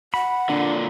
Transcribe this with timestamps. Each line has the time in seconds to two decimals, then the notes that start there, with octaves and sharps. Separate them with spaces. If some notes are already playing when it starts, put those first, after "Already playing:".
0.14 F#5 B5
0.49 A#2 D3 D4